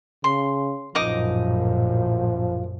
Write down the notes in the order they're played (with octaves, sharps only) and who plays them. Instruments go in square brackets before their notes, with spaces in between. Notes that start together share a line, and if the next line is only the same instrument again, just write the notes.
[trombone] C#3 [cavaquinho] C6
[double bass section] A#1 F#2 A2 [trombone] F3 [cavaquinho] D#4 D#5 D6